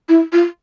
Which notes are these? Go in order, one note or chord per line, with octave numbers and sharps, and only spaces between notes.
E4
F4